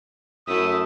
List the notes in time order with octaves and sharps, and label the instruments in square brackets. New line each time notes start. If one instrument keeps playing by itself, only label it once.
[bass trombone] F#2 [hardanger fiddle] A3 E4 [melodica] E5 [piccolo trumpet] D#6